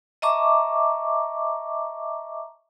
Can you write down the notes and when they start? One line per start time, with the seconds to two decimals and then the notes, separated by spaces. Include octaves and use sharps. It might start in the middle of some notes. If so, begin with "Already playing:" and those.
0.22 D#5 E5 A5 A#5 C#6 D6